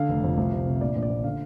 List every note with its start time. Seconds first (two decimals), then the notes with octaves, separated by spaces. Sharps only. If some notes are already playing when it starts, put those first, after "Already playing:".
Already playing: D3 F5
0.09 F1
0.24 F2
0.37 C2
0.52 C3
0.67 C3
0.81 A#1 D5
0.96 A#1
1.02 D5
1.10 A#1
1.24 D3 F5